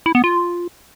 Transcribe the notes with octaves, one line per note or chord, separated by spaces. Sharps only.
E4
B3
F4